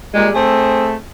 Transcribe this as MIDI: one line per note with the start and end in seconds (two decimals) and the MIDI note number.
0.14 0.28 46
0.14 0.28 55
0.14 0.28 56
0.34 0.93 57
0.34 0.93 60
0.34 0.93 68